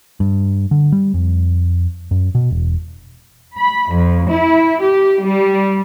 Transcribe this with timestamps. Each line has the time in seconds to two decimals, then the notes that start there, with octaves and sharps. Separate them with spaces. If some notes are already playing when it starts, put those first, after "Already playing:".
0.20 G2
0.71 D3
0.92 G3
1.14 F2
2.11 F#2
2.35 B2
2.51 E1
3.58 B5
3.91 F2
4.30 E4
4.83 G4
5.22 G3